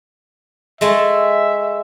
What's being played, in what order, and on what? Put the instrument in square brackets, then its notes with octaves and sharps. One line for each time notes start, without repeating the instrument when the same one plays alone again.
[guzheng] G#3 A3 A5 [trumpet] E5